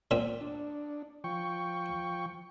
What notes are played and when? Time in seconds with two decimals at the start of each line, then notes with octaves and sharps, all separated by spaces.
0.11 A#2 C4
0.41 D4
1.24 F3 G5 C#6